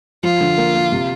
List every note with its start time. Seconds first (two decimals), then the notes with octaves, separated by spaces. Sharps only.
0.23 F3 F4
0.41 D3
0.58 A#3
0.75 A#3
0.92 C3